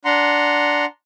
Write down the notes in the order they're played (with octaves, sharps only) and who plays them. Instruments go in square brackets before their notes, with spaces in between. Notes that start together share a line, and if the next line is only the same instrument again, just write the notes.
[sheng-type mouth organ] D4 F#5 A#5 C6